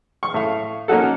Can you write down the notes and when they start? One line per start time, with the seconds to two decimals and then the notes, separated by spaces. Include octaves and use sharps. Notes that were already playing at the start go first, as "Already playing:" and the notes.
0.23 C#6
0.34 A2 F5
0.88 A#3 C#4 D#4 F#4 A4